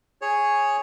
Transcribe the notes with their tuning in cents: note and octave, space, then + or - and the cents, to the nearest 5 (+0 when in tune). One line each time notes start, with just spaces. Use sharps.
G#4 +0 C#5 +0